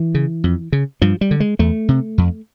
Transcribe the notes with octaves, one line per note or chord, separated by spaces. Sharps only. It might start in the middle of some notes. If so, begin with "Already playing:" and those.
Already playing: E3
C#3
F2
C#3
G2 F3
G3
D3
G#3
E2 A3
C3
F2